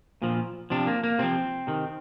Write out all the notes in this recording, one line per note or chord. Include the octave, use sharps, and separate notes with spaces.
A#2 F3
C3 F3 D4
A#3
A#3
C3 F3 C4
C3 D#3